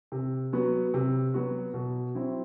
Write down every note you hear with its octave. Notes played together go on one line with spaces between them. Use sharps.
C3
F#3 B3 F#4
C3
F#3 B3 F#4
B2
F#3 C4 E4